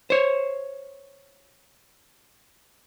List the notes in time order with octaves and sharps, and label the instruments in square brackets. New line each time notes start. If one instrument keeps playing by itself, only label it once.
[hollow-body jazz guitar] C5 C#5